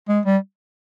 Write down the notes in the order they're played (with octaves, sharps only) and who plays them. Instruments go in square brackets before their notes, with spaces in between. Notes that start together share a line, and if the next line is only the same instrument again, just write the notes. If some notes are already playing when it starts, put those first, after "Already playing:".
[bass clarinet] G#3
G3